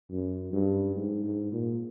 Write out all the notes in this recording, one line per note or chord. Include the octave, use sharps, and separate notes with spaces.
F#2
G2
G#2
G#2
A#2